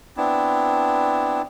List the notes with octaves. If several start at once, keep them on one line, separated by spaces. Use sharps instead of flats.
B3 C4 D4 E4